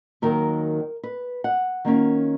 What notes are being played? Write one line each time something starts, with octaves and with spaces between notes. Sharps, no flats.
D#2 D#3 F#3 A#4
B4
F#5
D#3 A#3 C#4 F4